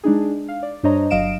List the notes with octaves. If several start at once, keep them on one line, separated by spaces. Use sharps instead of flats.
G#3 D4 D#4 G#4
F5
D5
G2 D4 C5 C#5 D#5 A#5
G1 F#3 D#5 F5 D7 E7